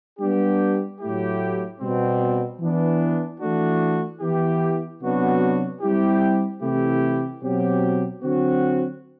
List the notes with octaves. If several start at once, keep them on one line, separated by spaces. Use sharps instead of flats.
G3 B3 D4 G4
A2 F#3 A3 E4 G4
B2 G3 C4
E3 B3 D4
E3 A3 D4 F#4
E3 B3 E4 G4
C3 F#3 B3 D4 F#4
G3 C4 E4 G4
C3 E3 A3 E4 G4
B2 F#3 C4 G4
D3 F#3 C4 F#4